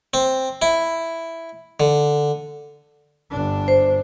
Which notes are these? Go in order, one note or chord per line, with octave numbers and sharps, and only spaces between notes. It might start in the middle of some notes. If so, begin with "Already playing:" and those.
C4
E4
D3
G1 D4
C5